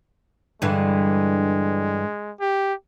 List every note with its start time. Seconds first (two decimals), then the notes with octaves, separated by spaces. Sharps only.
0.62 G2 D3 E3 G#3
2.40 G4